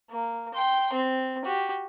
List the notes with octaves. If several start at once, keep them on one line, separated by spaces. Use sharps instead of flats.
A#3
G5 C6
C4
F#4 G4